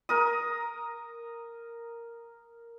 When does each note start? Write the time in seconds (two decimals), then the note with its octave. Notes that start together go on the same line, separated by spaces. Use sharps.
0.09 A#4 D#6